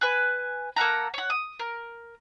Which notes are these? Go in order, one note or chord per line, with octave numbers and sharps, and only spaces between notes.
B4 G#5 F#6
A#3 A4 F#5 A#5
C#5 F#5
D#6
A#4